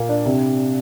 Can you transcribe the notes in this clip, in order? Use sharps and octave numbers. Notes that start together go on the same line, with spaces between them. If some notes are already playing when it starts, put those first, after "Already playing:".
Already playing: A#2 A#3
D4
C3